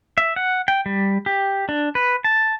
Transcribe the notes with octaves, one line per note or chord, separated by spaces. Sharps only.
E5
F#5
G5
G3
G4
D4
B4
A5